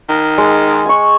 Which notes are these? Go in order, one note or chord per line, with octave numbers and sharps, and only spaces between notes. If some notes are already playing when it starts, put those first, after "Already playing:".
D#3
G#3
G#5 C#6